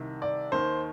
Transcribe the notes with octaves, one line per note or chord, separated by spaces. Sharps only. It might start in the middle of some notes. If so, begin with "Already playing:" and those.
Already playing: C2 C3 D#3
D5
D#2 D#3 C5